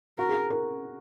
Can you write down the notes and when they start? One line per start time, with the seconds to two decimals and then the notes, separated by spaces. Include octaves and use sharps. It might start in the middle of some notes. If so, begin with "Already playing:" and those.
0.19 F#4 A#4
0.29 G#4
0.50 A#4